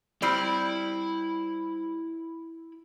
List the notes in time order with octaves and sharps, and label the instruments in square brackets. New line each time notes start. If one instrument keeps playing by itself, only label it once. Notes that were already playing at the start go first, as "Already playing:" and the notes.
[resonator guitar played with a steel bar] G3 C4 D5 [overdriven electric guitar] E4 B5